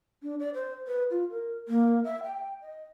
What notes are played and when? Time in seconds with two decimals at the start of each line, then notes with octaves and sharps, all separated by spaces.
0.23 D4
0.40 D5
0.54 C5
0.87 B4
1.10 F4
1.30 A#4
1.68 A#3
2.04 E5
2.23 G5
2.61 D#5